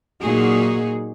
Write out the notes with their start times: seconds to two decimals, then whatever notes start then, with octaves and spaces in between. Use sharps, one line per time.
0.22 A#2 F#3 A#3 D#4 F#4 G#4